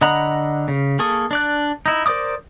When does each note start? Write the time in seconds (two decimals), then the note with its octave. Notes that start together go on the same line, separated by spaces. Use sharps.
0.01 D3 D#5 F#5 A#5 B5
0.68 C#3
0.99 A#3 G#4 A4 C#6 D#6
1.31 D4 D5 F#6
1.86 D#4 E4
2.06 A#4 C5 D5 D6 D#6